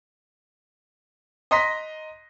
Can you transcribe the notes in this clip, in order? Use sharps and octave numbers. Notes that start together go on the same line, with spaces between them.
D#5 A#5 C6 A#6 B6